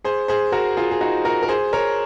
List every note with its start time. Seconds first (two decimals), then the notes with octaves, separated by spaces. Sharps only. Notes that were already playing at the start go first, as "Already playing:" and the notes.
0.05 G#4 C5
0.28 G#4 C5
0.52 F#4 A#4
0.77 F4 G#4
0.91 G#4
1.01 D#4 F#4
1.25 F#4 A#4
1.43 A#4
1.49 G#4 C5
1.73 A#4 C#5